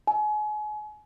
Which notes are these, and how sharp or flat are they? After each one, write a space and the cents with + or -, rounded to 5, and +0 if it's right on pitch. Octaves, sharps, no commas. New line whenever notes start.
G#5 +35